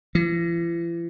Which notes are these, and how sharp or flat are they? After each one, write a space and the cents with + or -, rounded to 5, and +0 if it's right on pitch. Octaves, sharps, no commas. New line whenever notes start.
E3 +45